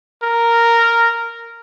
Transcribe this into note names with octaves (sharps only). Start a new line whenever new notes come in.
A#4